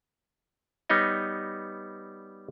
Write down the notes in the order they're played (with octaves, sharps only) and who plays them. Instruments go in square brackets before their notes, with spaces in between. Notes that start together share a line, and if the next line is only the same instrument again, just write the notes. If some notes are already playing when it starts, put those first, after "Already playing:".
[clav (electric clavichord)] G3 B3 D#4 C#5 D#5